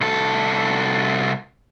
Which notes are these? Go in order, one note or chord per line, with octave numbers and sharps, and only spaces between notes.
C2 A4